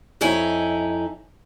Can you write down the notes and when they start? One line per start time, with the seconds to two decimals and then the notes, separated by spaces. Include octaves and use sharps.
0.21 F2 D#4 E4 C#5 G#5